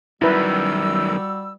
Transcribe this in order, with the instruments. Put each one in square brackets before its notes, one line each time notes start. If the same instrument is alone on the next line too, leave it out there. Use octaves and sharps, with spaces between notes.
[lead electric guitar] F#2 D#3 [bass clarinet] G3 [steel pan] E4 B4 [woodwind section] F#4 E6